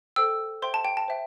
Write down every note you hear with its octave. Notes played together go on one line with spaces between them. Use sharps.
A4 C5 G5 E6
C5 E5 G5 C6
A5
G5
A5
C5 E5 G5